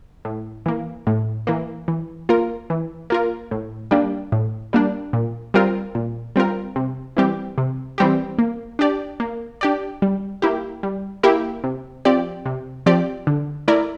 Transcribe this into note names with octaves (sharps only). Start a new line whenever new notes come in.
A2
E3 A#3
A2
E3 A#3
E3
A#3 F4 A#4
E3
A#3 F4 A#4
A2
G3 A#3 D4
A2
G3 A#3 D4
A#2
G3 C4 F4 A#4
A#2
G3 C4 F4 A#4
C3
E3 G3 C4 G4
C3
E3 G3 C4 G4
A#3
D4 G4 D5
A#3
D4 G4 D5
G3
A#3 E4 G4
G3
A#3 E4 G4
C3
F3 C4 G4 D5
C3
F3 C4 G4 D5
D3
A3 E4 A#4 D5